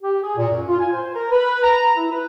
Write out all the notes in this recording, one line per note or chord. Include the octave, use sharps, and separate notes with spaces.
G4
G#4
A#2
F#2
F4
G#5
C5
A#4
B4
A#5
E4
B4